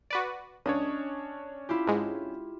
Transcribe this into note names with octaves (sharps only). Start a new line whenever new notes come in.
F#4 B4 D5 D#7
C#2 C#4 D4 C#5 D#5
E4 F4 G4
G#2 G#3